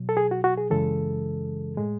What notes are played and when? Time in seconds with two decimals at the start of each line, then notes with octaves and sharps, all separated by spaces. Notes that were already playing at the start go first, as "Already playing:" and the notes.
Already playing: B2 F#3
0.09 A4
0.17 G#4
0.31 F#4
0.44 F#4
0.57 G#4
0.70 F#2 C#3 E3 G#3 A4
1.77 A2 G#3